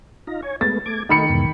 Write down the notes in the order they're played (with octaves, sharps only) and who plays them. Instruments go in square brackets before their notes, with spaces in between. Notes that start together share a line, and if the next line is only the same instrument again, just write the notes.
[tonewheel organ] D#4 F4 A#5
C#5 G#5
[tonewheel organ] G#3 A3 B3 [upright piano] A6
[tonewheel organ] A3 D6 G#6
[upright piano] D#3 B5 C#7 [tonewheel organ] A3 D#4
[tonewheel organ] E2 G#2 B2